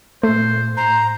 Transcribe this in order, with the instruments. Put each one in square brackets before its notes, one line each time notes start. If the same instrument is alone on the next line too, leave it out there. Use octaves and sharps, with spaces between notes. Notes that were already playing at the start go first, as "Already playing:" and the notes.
[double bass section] A#2 [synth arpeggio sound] A3 [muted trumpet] C5
[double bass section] A2 [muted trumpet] C5 [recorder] A#5